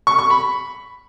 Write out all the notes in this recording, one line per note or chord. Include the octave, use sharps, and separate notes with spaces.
C#6
C#6
B5